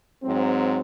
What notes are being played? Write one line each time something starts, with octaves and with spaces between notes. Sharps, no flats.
G#2 F#3 C4